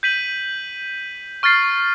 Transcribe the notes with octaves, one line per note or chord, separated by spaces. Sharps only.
G6 B6 D#7 F#7
C#6 F6 A6 C7